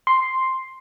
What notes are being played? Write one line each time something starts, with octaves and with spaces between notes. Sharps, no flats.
C6